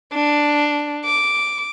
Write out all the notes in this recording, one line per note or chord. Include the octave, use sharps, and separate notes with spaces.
D4
D6